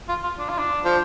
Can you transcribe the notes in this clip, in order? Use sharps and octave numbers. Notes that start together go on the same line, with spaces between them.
F4
F4
D4
F4
D4
F3